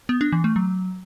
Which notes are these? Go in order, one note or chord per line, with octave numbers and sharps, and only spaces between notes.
B3
D4
E3
A3
F#3